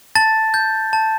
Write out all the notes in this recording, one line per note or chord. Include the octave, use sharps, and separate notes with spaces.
A5 A6
G6
A5